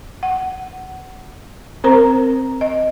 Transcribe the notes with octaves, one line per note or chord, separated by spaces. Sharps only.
F#5
C4 A#4 C5 A#5
D#5